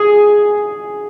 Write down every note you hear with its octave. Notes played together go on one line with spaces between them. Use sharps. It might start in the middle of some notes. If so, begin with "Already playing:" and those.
Already playing: G#4